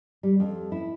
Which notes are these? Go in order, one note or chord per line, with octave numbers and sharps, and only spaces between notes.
G3
F2
E4